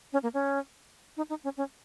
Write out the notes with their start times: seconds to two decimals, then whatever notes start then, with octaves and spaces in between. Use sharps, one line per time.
0.13 C#4
0.23 A#3
0.34 C#4
1.17 D#4
1.30 D#4
1.44 C#4
1.57 C#4